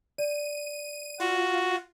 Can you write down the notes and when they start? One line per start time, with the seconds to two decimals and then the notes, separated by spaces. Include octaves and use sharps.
0.18 D5 D#7
1.20 F4 F#4